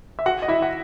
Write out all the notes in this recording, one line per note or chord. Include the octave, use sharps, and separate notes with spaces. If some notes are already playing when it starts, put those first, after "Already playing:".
E5
F#4 F#5
D#5
E4 E5
F#5